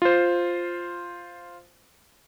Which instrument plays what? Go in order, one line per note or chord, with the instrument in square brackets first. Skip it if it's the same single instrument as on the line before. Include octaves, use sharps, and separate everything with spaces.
[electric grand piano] F4 C5